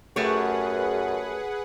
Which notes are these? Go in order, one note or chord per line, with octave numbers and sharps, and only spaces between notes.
F#2 A3 G4 G#4 B4 C#5 F#5